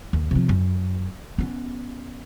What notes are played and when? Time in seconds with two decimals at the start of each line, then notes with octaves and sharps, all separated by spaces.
0.13 D#2
0.31 C3 F3
0.49 F#2
1.38 B3 C#4